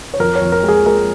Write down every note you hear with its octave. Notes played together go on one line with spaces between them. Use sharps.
C#5
F2 A#4
C#5
F2
A#4
G#3
G#4
G#3 A#4